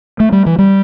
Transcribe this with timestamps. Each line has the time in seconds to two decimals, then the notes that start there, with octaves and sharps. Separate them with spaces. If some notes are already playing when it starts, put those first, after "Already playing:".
0.20 A3
0.32 G3
0.46 E3
0.58 G3